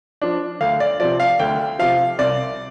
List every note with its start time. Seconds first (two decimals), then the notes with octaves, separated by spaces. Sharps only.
0.22 F3 D4
0.61 D2 F5
0.80 D5
1.00 C3 F3 D5
1.20 F5
1.39 D2 G5
1.79 C3 F3 F5
2.19 C2 D5